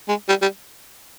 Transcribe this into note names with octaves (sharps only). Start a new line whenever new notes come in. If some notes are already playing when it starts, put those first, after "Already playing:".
G#3
G3
G3